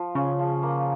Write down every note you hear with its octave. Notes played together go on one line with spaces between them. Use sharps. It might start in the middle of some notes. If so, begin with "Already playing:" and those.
Already playing: F3
C#3 C#4
F3
A#3